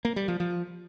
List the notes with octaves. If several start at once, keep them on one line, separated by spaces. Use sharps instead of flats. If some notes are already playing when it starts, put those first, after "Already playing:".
A#3
G3
F3
F3